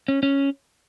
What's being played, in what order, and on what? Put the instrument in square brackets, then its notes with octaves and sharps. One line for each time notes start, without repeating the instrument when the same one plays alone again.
[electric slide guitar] C#4
C#4